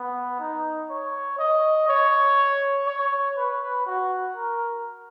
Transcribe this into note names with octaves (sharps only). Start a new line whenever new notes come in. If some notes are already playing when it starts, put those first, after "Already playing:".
Already playing: B3
D#4
C#5
D#5
C#5
C#5
B4
F#4
A#4